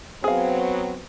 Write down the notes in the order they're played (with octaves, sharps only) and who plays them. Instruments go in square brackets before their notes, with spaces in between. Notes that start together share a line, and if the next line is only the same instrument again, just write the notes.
[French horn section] F#3 B3 C4 [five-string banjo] G#4 F5